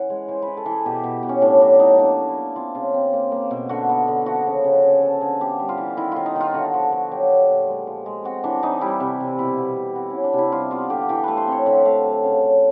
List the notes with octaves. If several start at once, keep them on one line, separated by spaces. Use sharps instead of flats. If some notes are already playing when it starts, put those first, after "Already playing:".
Already playing: E3 C#4 F#5
G#3 C#5
E3 C5
B4
E3
A4
E3
G#4
B2 G4
B2
B2
C#4
A2 D4
F#3 D4
A2 D#4
A#3 D4
A#3
E4
A#3
C4 F4
C#3 F4
C4
A#3
A#3
B2
D3 F#4
B3
D3
F3 F#4
C#3
C#3
D3 G#4
D3 A4
D3 G#4
B3 G4
G3
F4
E3
D#3 E4
D#3 F4
D#4
D#3 F4
D3 F#4
F3
D3
F#3 G4
B3
A#2
G#3
F3
G#3
C4 F#4
E3 D4
E3 D#4
G3 E4
C3
C3
B2 E4
B2
B2
C4 F#4
E3 C#4
D4
C3
E4
G3 F4
B3 F4
D3 G4
E3 G4
A3 B4
C5
C4 C#5
D3 E5
F#5
A3 F5
F#3 F#5
C#3 F5
F#3